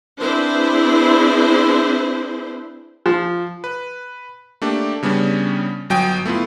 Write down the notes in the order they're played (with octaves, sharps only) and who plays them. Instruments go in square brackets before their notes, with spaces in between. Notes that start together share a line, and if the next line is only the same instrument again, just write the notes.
[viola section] C4 D4 E4 G#4 B4 C5
[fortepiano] F3
[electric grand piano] B4
A3 A#3 D4 G4
C#3 G3 B3 C#4 D4
G1 F#3 G5 G#5 D#6
A3 B3 E4 F4